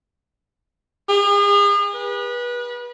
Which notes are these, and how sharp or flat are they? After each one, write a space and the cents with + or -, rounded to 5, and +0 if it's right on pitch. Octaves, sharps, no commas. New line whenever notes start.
G#4 -40
B4 -30